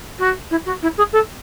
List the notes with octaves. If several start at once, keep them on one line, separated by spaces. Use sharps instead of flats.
F#4
E4
F#4
E4
G#4
A4